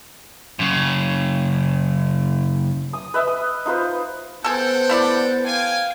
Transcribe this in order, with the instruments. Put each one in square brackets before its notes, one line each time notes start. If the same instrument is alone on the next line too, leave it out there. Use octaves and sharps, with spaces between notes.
[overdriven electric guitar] F#2 C#3
[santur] D#6
B4 D#5 E5 B5
D#6
D#4 F4 B4 C5
[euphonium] B3 [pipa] G#4 A4 [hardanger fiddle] C5 A5 [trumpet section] F#5 G5
[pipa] A3 E4 D5
[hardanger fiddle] F5 G5 [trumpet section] G#5